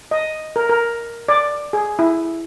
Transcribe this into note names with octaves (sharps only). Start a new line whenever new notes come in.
D#5
A#4
A#4
D5
G#4
E4